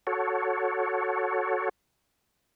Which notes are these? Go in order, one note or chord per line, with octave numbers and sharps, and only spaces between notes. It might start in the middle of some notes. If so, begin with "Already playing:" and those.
F#4 A4 C#5